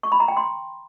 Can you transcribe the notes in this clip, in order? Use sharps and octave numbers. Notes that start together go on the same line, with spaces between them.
C#6
B5
A#5
G5
C6